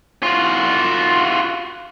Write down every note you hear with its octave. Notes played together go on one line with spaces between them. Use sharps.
F4 F#4